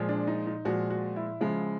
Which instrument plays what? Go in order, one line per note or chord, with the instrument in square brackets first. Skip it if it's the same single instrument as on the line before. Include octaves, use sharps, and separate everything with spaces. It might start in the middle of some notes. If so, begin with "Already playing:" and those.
Already playing: [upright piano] A#2 F3 G#3
D4
D#4
D#4
A#2 F3 G#3 F#4
F#4
E4
C#3 F3 G#3